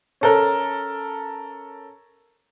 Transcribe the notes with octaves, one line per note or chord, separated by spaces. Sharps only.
C#4 A4 A#4